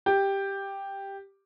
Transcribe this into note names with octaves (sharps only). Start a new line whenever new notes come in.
G4